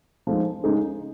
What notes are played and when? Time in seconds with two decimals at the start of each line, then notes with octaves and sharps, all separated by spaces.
0.27 F3 G#3 D#4
0.64 C#3 G#3 D#4 G#4